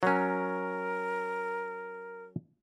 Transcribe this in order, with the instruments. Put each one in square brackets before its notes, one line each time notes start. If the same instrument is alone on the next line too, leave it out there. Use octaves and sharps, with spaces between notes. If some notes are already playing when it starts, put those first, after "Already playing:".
[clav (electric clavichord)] F#3 C#4 [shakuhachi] A#4